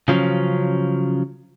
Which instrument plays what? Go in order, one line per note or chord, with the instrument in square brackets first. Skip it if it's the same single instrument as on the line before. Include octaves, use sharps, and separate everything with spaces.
[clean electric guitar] C#3 F3 F#3 C#4